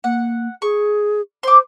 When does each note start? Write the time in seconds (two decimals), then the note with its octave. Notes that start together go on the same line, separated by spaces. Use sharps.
0.04 A#3 F#5
0.62 G#4 C#6
1.43 C5 C6 D6